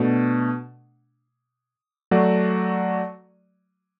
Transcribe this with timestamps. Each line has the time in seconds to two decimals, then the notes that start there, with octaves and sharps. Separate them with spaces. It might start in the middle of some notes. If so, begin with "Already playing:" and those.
Already playing: B2 A3 D4
2.11 F#3 A3 F#4 D5